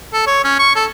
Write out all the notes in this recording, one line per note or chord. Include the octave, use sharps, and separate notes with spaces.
A4
C#5
C#4
C#6
A4